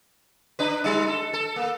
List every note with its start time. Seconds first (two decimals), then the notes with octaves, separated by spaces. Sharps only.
0.59 D4 B4
0.84 G3 D#4
1.08 A4
1.33 A4
1.56 A#3